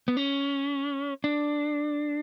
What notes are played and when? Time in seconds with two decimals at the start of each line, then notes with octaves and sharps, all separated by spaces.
0.08 B3
0.17 C#4
1.24 D4